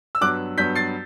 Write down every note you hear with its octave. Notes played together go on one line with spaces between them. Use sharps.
E6
G2 F#3 B3 D6 F#6
G2 F#3 B3 G6 B6
A6 C7